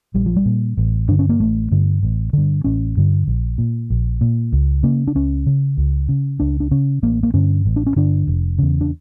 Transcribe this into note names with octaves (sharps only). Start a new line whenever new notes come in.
A#1 G3
F3
G3
A#2
A1
G2 D3 D4
C#4
A#3
A1 A3
G2 D3
A1
G2 D3
A1 C#4
G2 D3
A#1
A#2
A#1
A#2
C#2
C#3 A#3
D4
C#2 C#4
C#3
C#2
C#3
C#2 D4
D4
C#3 C#4
A1 A#3
A#3
G2 D3 C#4
A1
D4
C#4
G2 D3 D4
F1
E2 C#3
D4